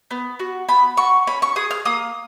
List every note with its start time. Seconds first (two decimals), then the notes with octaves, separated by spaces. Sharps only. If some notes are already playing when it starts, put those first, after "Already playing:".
0.11 B3
0.39 F#4
0.69 B3 B5
0.97 F#4 C#6
1.27 C#4 B5
1.42 C#6
1.56 G#4 D#6
1.71 F6
1.85 A#3 D#6